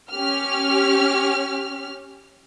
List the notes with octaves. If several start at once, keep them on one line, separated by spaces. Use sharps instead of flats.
C#4 G4 F6